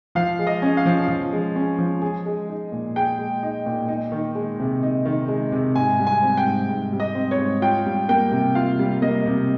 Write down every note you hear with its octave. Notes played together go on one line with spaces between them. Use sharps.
F3 F5
G#3
D#5
C#4
F5
F3
F3
G#3
C#4
F3
G#4
G#3
D#4
A#2
G#4 G5
G#3
D#4
A#2
D#4
D#3
G#3
C3
D#4
D#3
G#3
C3
G#2 G#5
G3
G#5
C4
G5
G#2
G#2
G3
D#5
C4
C#5
G#2
F4 G5
G3
A#3 G5
C3
F4 F5
G3
A#3 D#5
C3